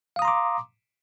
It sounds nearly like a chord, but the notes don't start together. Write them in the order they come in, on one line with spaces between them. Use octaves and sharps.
F5 D#6 A#5 C6 D6